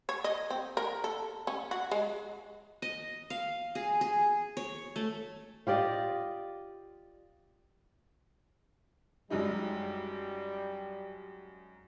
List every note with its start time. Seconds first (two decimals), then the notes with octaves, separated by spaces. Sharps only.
0.09 C#5
0.24 D#5
0.50 C4
0.77 A#4
1.04 A4
1.47 C#4
1.71 F#4
1.91 G#3
2.82 D#5
3.30 F5
3.75 G#4
4.01 G#4
4.57 C#5
4.96 A3
5.67 F4 G4 D5 D#5
9.30 F#2 G3 G#3 D#4